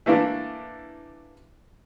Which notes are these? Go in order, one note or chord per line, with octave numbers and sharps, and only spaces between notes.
E3 A3 A#3 D4